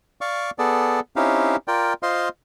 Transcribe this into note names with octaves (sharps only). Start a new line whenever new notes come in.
D5 F5 C#6 D6
B3 G#4 A4 D5
C4 C#4 D#4 E4 G4 F5
F4 A#4 D5 G5
F4 C5 D#5 F5 C6